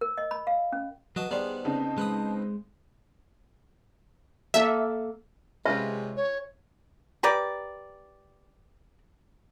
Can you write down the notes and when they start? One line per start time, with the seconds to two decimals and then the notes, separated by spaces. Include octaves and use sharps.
0.01 A#4
0.18 D#5
0.31 B5
0.47 F5
0.72 C#4
1.16 F#3 F#4 B4 D#5 A5
1.31 D#3 G3 B3 D4 G#4 C5
1.65 C#3 C4 D#4 A5
1.98 G#3 B4 B5 D#6
4.54 A#3 A4 E5
5.66 C3 G#3 C#4 F4 B4 E5
6.16 C#5
7.23 G4 A#4 B4 D5